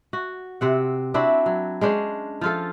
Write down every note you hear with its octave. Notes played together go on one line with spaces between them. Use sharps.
F#4
C3 C4 F#5
C4 D4 E4 F#4
F#3
G#3 C#4 D4 C5
F3 F4 A4